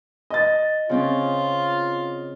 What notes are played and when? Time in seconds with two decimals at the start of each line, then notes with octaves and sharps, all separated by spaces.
0.30 D#5 A6
0.89 C#3 C4 C#4 F4